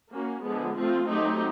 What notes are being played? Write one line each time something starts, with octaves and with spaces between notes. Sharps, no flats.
A#3 C#4 F#4
D3 F3 G#3 B3
F3 A3 C4 F4
F#3 A3 C4 D#4 G4